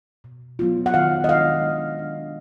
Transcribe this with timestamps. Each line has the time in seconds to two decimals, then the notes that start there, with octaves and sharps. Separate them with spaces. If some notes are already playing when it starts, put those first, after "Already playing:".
0.24 B2
0.59 F#3 B3 F4
0.86 F#5
0.94 D#3 F5
1.24 D#5
1.29 G#3 D4 F5
1.64 D#3
1.99 G#3 D4